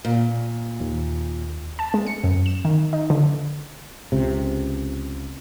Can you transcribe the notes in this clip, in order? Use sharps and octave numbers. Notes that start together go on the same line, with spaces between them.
A#2
D#2
A5
G#3
C#7
F#2
E7
D#3
D#4
D3
C#2 C3